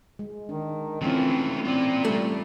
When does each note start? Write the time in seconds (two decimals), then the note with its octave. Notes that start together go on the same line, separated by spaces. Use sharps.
0.19 G#3
0.49 D#3 D4
1.02 E3 A3 C4 C#4 E4 F4
1.65 C4 F4 D5
2.05 G3 A3